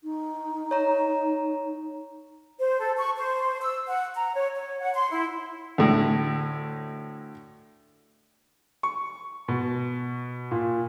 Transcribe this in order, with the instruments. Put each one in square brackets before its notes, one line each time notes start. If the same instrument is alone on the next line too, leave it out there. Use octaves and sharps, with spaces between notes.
[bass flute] D#4
[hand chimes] C#5 A#5
[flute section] C5
A4
C#6
C5
E6
F#5
A#5
C#5
C#5
F#5
C6
E4
[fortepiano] D2 A2
[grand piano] C#6
B2
A#2